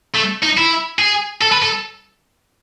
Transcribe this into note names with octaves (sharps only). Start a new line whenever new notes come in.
A3
D#4
E4
G#4
A4
B4
A4